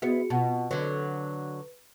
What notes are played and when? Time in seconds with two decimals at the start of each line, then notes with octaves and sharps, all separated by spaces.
0.02 B3 E4 F#4 G#4 C#7
0.30 B2 F4 F#5 A5
0.71 D3 F#3 B4